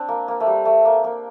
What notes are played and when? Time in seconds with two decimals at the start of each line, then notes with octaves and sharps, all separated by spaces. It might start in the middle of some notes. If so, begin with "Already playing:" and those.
Already playing: C4 D4
0.08 A#3
0.28 A#3
0.40 A3
0.47 G3
0.65 A3
0.85 A#3
1.04 A#3